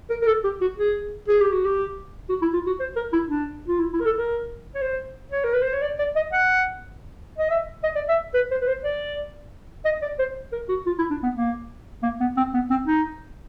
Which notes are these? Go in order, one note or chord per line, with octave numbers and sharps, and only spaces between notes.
A#4
A#4
A4
G4
F#4
G#4
G#4
G4
F#4
G4
F#4
E4
F4
F#4
C5
A#4
E4
D4
F4
E4
E4
A#4
A4
A#4
C#5
C5
C#5
A#4
B4
C5
C#5
D5
D5
D#5
F#5
D#5
E5
D#5
D5
E5
B4
C5
B4
C5
D5
D#5
D5
C5
A#4
F#4
F4
E4
D4
B3
A#3
A#3
B3
C4
B3
C4
D#4